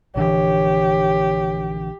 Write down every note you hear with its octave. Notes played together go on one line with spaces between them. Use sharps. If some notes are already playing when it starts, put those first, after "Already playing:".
A#1 D3 E3 G4 C#5